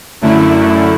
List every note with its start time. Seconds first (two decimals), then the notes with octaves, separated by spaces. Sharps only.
0.21 F#2 D3 A3 E4